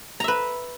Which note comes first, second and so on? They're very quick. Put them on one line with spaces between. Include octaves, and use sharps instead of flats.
A#5 E5 B4